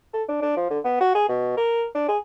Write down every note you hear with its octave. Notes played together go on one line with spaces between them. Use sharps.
A4
D4
D4
F3
D3
B3
F#4
G#4
B2
A#4
D4
G#4